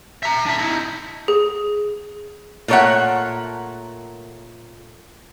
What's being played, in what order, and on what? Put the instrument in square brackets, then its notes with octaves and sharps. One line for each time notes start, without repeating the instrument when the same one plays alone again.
[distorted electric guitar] E5 A#5
D4 E5
D#4 E4
[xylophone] G#4
[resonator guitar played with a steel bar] A#2 A3 A#4 C#5 E5 F#5